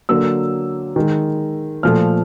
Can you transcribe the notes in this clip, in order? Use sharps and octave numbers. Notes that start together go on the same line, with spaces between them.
D3 F#3 A#3 E6
D#3 G#3
A#2 F3 A3 F6